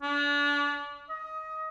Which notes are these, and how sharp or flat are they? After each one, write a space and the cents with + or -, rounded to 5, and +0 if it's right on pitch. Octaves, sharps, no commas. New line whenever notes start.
D4 -30
D#5 +20